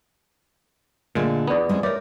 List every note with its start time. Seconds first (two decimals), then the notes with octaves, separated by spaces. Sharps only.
1.15 A#2 D3 G#3 A3
1.47 E2 B3 F4 D5
1.69 G#3 C4 C#4
1.83 A#4 B4 C#5 D5 E5